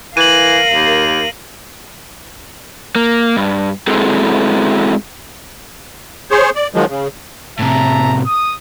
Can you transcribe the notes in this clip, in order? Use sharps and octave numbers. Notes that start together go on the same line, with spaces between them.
E3 A#4 F5 D#7 F#7
D#2
A#3
G2
G#3 C4 E4 F#4 G#4 A4
G#4 C5 C#5
D5
D#3 F3 F#3 G#3
C#3
A2 C3 E5 A5 A#5
D#6